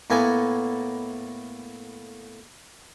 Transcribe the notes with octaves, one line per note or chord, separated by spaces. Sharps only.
A2 A#3 B3 G#5